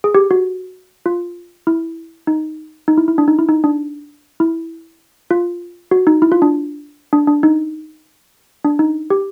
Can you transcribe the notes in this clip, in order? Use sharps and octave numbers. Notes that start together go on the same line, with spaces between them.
G#4
G4
F#4
F4
E4
D#4
D#4
E4
E4
D4
D#4
E4
D#4
D4
E4
F4
F#4
D#4
E4
F4
D4
D4
D4
D#4
D4
D#4
G4